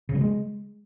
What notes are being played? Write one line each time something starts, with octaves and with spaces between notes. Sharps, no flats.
C#3
G3
G#3